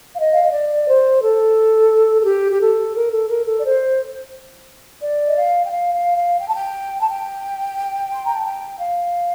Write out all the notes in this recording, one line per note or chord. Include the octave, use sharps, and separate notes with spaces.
F5
D#5
F5
D#5
D5
C5
A4
A4
G4
G4
A4
A#4
A4
A#4
A4
D5
C5
D5
D#5
F5
G5
F5
F5
F5
G5
A5
G5
A5
G5
C6
A#5
A5
G5
F5